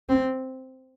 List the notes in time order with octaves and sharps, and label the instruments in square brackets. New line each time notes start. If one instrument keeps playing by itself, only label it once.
[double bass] C4